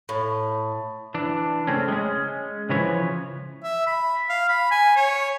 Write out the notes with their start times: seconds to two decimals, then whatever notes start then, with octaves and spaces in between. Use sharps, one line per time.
0.09 A2
1.14 E3 D4
1.67 C#3 A3 C4 C#4
1.88 G#3 C#4
2.69 C#3 E3 F3 B4 C#5
3.63 E5
3.87 B5
4.29 F5
4.49 B5
4.71 G#5
4.96 C#5